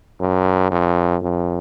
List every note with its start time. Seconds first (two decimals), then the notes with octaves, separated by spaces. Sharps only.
0.20 F#2
0.71 F2
1.22 F2